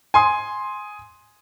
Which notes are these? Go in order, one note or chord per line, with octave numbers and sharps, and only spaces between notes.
G#5 C6 D#6